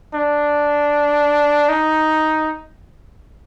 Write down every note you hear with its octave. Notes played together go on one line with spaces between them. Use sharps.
D4
D#4